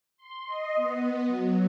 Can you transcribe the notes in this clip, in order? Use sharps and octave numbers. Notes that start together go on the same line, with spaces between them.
C6
D#5
B3
F#3